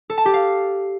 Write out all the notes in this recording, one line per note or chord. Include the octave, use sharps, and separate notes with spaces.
A4
A5
G4
F5